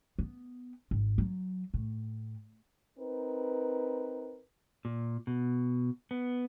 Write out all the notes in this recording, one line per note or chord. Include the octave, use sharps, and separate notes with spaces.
B3
G#1
F#3
A2
C4 D#4 A#4 B4
A#2
B2
B3